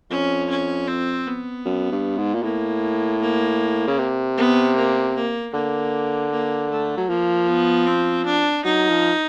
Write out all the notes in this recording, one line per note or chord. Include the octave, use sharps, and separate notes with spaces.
F2 C#4
C#4
C4
B3
F#2
G2
G#2
A#2
A2 A#3
A#3
C#3
C3
B3
A#3
A#3
D3 A#3
A#3
A3
F#3
F3 A#3
B3
C4
D4
F#3 D#4
F3